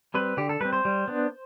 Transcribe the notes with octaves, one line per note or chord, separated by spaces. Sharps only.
G3 C4 B4
D3 G4
A4
G3 C4 B4
C5
G3
B3 D4